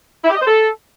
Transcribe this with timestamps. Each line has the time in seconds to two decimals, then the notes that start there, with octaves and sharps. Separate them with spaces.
0.25 E4
0.30 G4
0.35 D#5
0.41 C5
0.46 A4